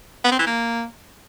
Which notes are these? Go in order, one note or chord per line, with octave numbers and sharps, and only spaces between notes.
B3
C4
E3
A#3